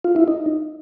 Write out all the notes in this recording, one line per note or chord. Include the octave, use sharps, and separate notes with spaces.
F4
E4
D#4